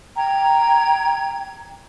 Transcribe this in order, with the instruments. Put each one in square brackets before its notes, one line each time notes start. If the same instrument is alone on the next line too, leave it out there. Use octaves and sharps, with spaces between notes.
[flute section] G5 A#5 G#6